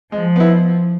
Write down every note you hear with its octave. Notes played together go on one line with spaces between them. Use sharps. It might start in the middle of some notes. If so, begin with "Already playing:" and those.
F3 G#3
B3 E4